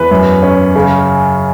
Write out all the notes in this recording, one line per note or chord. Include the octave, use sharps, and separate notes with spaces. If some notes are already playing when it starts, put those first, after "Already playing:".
Already playing: E2 B4
F#2
C#4
C#3